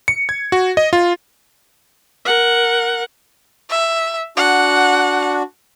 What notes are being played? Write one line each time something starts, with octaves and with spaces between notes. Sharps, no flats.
C#7
G#6
F#4
D#5
F4
A#4 F#5
E5
D4 F#4 F#5